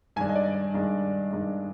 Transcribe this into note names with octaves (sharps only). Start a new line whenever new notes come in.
G2 D#3 G#3 D4 G#5
D#5
D5
D5
G2 D#3 G#3 D4
G2 D#3 G#3 D4